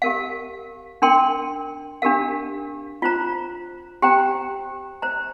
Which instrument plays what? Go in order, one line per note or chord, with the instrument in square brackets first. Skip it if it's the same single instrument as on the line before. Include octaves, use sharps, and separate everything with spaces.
[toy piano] G4 A#4 F5
D4 A#4 G5 C6
D4 G4 A#4 F5
F4 C5 A#5
G4 C5 G5 A#5
C5 A#5